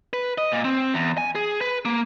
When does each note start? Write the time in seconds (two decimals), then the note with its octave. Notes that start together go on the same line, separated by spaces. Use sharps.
0.13 B4
0.38 D#5
0.52 A#2
0.65 C4
0.94 E2
1.18 G#5
1.35 G#4
1.61 B4
1.85 A#3